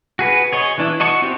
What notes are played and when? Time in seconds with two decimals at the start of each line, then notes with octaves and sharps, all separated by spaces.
0.19 F#4 G#4 B4
0.53 G#4 C#5 D#5
0.78 E3 D4 E4
1.00 F#4 D#5 A5 C#6
1.22 C4 E4 F#4 G4